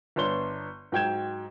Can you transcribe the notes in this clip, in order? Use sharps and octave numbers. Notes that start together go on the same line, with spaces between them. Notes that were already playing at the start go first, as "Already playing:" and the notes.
G1 B3 D4 C#5 C6 G7
G#2 F#3 G5 G6 G#6 E7